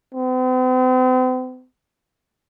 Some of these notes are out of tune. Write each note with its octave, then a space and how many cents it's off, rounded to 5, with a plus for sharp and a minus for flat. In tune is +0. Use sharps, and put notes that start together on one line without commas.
C4 -45